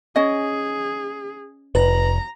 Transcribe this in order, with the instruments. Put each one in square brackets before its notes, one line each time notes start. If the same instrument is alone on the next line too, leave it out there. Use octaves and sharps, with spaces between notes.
[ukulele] C#4 D#5 [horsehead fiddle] G#4
[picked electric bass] F1 [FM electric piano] B4 [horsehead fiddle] A#5